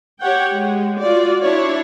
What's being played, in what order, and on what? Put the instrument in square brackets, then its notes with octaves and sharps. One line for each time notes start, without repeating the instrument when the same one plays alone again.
[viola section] G4 C#5 F#5 G5
G#3
F4 F#4 D5
D4 E4 C#5